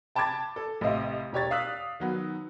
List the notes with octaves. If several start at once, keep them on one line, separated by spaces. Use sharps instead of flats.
G5 A5 B5 D6 G#6 A6
A4
A1 C3 D#5 F5
E1 G4 C#5 A6
D5 F5 D#6 E6 F#6 B6
D#3 F#3 B3